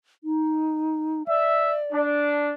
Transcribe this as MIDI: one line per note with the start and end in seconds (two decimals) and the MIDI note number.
0.24 1.23 63
1.28 2.05 74
1.28 1.73 76
1.93 2.52 62